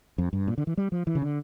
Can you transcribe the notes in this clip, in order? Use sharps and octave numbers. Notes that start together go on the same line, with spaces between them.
F2
G2
A#2
D3
E3
G3
F3
E3
C#3
D3